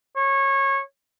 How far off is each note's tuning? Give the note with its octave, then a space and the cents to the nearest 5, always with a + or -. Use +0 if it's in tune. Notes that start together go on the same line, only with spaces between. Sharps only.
C#5 -20